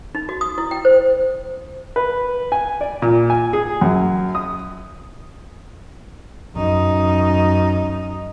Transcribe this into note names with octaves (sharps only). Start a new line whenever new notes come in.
D#4
F#4
D#6
E4
G5
C5
B4
G#5
D5
A#2
G#5
G#4
F#2
D#6
F#2 D#4